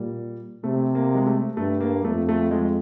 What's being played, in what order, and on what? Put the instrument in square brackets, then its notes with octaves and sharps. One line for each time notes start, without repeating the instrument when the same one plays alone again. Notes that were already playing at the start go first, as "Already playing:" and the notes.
Already playing: [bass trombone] A#2 [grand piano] G3
[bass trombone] C3 [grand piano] A3
[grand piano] A#3
G#3
A3
[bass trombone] G2 [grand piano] A3
[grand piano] A#3
[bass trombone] F2 [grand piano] A3
[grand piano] A3
G#3